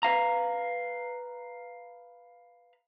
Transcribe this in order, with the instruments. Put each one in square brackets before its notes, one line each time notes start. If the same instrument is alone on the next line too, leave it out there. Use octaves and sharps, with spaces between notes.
[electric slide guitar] B4 F5 A#5